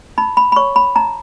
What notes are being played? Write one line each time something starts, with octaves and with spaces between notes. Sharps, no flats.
D#4 B5
B5
B5
C#5 C#6
B5
D#4 A#5